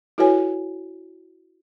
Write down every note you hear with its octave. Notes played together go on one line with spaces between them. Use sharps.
E4 F#4 A4 B4 C#5 G#5